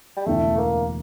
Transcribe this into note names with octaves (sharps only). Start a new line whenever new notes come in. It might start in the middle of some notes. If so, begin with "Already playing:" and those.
G3
E1 D2 C#3 E3 A3
A#3